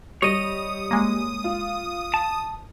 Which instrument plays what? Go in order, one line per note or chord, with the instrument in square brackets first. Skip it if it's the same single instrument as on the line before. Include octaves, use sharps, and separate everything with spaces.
[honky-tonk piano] G3 [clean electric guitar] C#5 D#5 [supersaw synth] D#6
[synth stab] G#3 A#3
[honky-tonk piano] F4
[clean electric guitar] A5